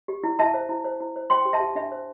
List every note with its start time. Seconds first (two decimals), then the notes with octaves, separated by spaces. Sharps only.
0.08 G4
0.24 E4
0.39 E4 E5 A5
0.54 C5
0.69 E4
0.85 C5
1.00 E4
1.16 C5
1.30 C5 G5 C6
1.45 G4
1.53 E5 A5
1.60 G4
1.75 D4 E5
1.92 C5